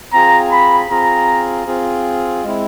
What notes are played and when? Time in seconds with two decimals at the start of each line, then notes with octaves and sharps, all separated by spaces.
0.13 C4 F4 G#4 A#5
0.52 B5
0.90 C4 F4 G#4 A#5
1.67 C4 F4 G#4
2.44 G#3 C4 E4